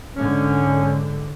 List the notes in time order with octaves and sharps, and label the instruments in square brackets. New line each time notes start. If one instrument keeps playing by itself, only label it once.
[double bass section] G#2 D3 [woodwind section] C#4